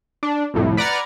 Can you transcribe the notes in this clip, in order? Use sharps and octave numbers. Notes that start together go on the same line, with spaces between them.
D4
C2 F2 A2
B4 D5 F#5 A#5 F6 G#6